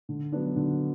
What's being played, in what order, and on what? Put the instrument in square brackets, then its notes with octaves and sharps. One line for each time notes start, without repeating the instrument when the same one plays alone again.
[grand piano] D3
F#3 B3 D4
D3